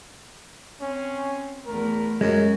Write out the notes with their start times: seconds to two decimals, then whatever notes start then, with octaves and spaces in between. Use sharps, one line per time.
0.81 C4 C#4
1.66 E2 A3 A#4
2.21 F#2 F#3 G#3